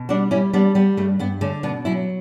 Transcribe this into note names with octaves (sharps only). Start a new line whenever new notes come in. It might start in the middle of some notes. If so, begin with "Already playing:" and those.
Already playing: B2
G3 D4 F#4
G3 C#4 E4
G3 B3 D4
G3 B3
G2 A3
G2 B3
D3 A3 C#4
B2 B3 D4
F#3 C#4 E4